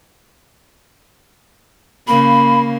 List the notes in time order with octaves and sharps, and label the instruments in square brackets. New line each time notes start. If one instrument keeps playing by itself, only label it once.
[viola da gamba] C#3 A#3 [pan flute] B5